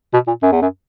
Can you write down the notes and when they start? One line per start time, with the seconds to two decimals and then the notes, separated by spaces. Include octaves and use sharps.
0.13 B2
0.28 A#2
0.43 F#2
0.52 E2
0.62 F#2